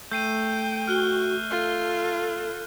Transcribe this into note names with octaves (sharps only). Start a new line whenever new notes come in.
A3 G5 G6 C7 D#7
F#4 F6 F#6 G7
F4 A4